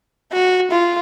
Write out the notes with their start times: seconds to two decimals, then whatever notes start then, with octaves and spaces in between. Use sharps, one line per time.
0.33 F#4
0.72 F4